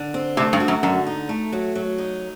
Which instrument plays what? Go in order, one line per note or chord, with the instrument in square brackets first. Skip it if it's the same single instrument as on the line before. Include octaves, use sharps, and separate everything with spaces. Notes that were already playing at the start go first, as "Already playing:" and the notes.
Already playing: [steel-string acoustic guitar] D3
C4
[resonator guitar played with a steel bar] C3 [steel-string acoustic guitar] A3
[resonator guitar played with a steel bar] G2
[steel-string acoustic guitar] F#4
[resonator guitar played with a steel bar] F#2
[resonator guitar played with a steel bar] F#2 [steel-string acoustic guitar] D3
[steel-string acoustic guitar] D#4
A3
F#3
F#3
D#4